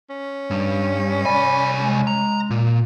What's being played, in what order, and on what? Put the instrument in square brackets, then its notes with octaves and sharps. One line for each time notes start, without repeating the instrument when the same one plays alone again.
[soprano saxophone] C#4
[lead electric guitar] G2
[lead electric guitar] C2 G#5 [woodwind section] D5 B5
[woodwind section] G#3
[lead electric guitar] A#5
A#2